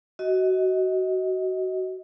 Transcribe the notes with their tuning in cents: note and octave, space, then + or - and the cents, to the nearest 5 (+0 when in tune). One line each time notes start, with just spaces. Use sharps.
F#4 +20 D#5 +20